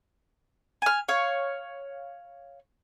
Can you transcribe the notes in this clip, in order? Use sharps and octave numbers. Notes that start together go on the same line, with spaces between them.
G#5 F6
C#5 F5